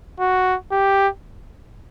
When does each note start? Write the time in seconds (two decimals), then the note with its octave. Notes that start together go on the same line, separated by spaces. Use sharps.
0.20 F#4
0.72 G4